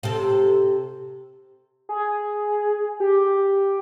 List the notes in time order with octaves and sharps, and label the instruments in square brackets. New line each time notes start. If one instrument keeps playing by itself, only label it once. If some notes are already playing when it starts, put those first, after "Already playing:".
[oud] C3 A4
[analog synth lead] G#4
G4